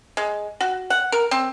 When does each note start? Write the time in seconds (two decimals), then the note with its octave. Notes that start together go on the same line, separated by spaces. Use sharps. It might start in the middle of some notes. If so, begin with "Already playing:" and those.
0.17 G#3
0.61 F#4
0.90 F#5
1.12 A#4
1.31 C4